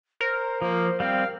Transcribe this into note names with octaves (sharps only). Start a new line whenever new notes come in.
A#4 C5
F3 A#3 C5
G3 C4 F5 G5